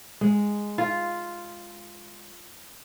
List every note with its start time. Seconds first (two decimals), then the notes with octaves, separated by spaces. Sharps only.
0.21 G#3
0.78 F4